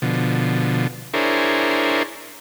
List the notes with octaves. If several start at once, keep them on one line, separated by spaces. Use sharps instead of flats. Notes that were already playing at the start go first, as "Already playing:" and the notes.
B2 D3 F3
D4 E4 G#4 A#4 C5 C#5